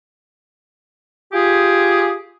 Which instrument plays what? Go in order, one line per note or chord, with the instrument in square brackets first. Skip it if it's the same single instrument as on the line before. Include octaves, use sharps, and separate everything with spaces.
[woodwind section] F4 G4 G#4